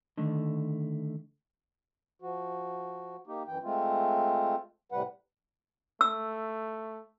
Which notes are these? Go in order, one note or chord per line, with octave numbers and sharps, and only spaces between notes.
D3 D#3 A3
F3 F#4
A#3 D#4 G4
F#2 E3 G5
G#3 A3 C4 F4
A2 C3 G3 B4 F#5
A3 E6